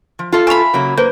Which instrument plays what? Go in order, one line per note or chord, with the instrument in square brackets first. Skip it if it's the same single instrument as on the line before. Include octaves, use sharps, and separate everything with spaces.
[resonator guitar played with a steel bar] F3
F4 A4 F5
[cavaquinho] E5 B5 [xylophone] G#5 C#6 F7
[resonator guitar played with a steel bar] C#3 F#3 A#3
[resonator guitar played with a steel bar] A#3 [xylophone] B4 C5 G6